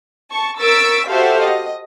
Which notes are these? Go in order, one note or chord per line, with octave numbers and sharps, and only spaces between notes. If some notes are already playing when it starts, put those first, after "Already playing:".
A5 C#6
A#4 C#6 E6 A6 B6 D7
F#4 G4 A4 C5 E5 F5
D#5